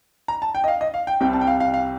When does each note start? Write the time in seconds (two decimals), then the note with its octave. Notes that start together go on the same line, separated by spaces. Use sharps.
0.28 A#5
0.42 A5
0.55 G5
0.64 D#5
0.68 F5
0.81 D#5
0.94 F5
1.07 G5
1.21 C2 C3 G3 C4 G5
1.33 A5
1.41 G5
1.47 F5
1.60 F5
1.74 F5